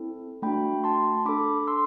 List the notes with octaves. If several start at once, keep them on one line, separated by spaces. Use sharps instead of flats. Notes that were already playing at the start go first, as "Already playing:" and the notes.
Already playing: C4 E4 A4
A3 D4 F#4 G5 B5
A5 C6
D4 A4 B5 D6
C6 E6